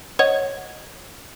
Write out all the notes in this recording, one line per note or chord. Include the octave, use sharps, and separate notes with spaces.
C#5 D#5 F#5